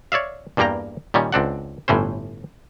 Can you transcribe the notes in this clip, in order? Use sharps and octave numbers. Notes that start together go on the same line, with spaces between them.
C#5 D5 E5 F5
E2 G2 G3 A#3 G5 A#5
A#2 D#3 G3 C#4
C#2 C4 D4 F#5
G1 A2 E3 C#4 C5